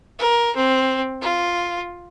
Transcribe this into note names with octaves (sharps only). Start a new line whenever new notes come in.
A#4
C4
F4